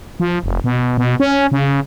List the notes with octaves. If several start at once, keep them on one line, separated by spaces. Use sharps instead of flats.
F3
F1
B2
B2
C#4
C#3